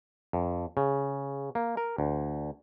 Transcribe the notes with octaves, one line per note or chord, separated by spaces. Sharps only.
F2
C#3
A#3
A#4
D2